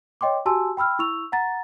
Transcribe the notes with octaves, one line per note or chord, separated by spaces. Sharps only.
C#5 D#5 G5 C6 D6
F#4 G4 G#5 A5 C6 E6
G5 B5 E6 F6
E4 C#6 E6 F7
F#5 A#5 A6